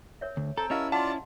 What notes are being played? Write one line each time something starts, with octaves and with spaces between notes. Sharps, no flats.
A#4 C#5 E5
D2
C4 A4 G5 A5 A#5
C#4 E4 G4 A#4 D#5 F5 A5 E6
F4 D5 F#5 A5 C6